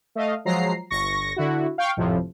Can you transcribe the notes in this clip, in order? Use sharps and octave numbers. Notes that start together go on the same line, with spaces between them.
A3 D#5 F5
F3 F#3 G#3 A#5 C7
G1 C#6 A#6
D3 E4 F#4
F5 G5 C#6
G#1 F2 A2 C3 F3